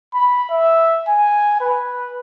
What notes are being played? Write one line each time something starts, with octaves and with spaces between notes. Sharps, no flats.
B5
E5
G#5
B4